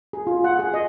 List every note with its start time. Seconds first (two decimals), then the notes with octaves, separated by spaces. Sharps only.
0.13 G#4
0.27 F4
0.44 F#5
0.59 G#4
0.74 D#5